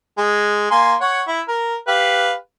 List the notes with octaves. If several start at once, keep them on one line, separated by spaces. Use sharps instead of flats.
G#3
A#3 G#5 C6
C#5 F#5
E4
A#4
G4 B4 F5